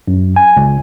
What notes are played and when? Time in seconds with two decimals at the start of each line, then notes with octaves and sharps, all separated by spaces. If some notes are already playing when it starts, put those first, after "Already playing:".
0.08 F#2
0.36 G#5
0.57 C#2